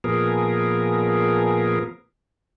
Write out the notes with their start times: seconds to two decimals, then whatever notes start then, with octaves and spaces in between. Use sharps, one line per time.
0.04 A#2 F3 B3 G#4 A#4